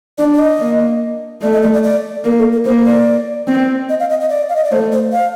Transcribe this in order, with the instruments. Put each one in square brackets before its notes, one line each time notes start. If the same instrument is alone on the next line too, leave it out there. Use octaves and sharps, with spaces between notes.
[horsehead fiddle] D4 [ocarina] D5
[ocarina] D5
D#5
[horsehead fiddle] A#3
[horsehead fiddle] A3 [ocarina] D5
[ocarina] D#5
D5
D5
D5
[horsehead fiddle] A#3 [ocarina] A#4
[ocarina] A4
A#4
[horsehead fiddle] A#3 [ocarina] C5
[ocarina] D5
[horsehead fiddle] C4
[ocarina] D#5
F5
D#5
D#5
D5
F5
D#5
D5
[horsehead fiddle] A3 [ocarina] C5
[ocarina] C5
F5